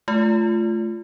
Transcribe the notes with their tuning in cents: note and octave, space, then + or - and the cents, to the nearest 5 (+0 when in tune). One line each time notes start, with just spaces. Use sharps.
A3 -20 F4 -15